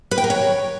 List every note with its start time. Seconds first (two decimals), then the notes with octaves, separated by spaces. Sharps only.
0.11 B4
0.18 G5
0.24 A#4
0.30 C#5